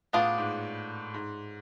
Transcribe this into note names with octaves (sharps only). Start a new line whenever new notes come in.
A2 B3 D4 F4 G#4
G#2
G#2